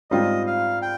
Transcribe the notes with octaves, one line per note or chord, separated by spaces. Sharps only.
G#2 G3 C4 F4 D#5
F5
G5